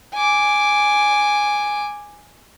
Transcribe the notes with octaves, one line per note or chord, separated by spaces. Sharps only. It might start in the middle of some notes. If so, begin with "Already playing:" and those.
G#5 D6